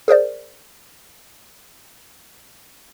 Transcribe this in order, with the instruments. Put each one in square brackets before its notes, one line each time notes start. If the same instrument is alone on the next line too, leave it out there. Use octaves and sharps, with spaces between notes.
[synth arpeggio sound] G#4 A#4 C5 D5